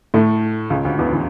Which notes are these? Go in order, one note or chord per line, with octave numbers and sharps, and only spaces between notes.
A2 A3
C#2 C#3
D2 D3
E2 E3
E3